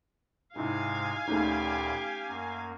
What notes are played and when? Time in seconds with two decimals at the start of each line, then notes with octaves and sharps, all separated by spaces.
0.56 G#2 C3 G#3 D#4 E4 F5 G#5
1.28 D2 A#2 A3 C#4 D#4 G4 B4
2.28 F#2 A#3